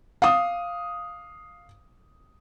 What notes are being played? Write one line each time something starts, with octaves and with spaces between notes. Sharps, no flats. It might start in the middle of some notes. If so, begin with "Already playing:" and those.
F5 D#6